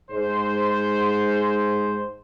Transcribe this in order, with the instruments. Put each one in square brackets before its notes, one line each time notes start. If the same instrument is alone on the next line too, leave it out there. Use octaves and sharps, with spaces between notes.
[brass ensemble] G#2 C5